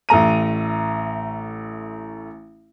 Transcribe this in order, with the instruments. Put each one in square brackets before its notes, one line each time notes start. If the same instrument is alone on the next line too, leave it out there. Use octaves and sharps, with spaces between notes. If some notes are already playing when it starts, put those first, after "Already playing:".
[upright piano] A1 A3 A#5 D#7